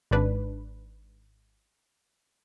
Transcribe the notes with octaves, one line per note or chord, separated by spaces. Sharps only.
G#1 G#2 D4 B4